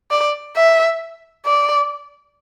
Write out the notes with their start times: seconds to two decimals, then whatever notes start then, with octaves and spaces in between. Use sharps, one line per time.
0.11 D5
0.56 E5
1.46 D5